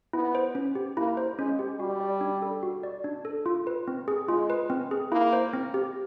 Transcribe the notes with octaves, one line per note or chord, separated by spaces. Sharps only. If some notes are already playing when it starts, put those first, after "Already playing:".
B3 E4
C5
C#4
G4
A#3 E4
C5
G#3 C#4
G4
G3 F#4
D5
D4
A4
F#4
D5
D4
A4
F4
B4
C4
G#4
G#3 F4
B4
C4
G#4
A#3 E4
C5
C4
G4